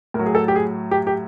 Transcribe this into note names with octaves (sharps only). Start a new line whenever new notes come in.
A2 F#3 A#4
G#4
A4
G4
G#4
G4
G4